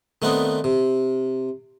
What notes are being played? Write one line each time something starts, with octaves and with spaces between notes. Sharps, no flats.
D#3 A3 B3 C4 D4 D#4
C3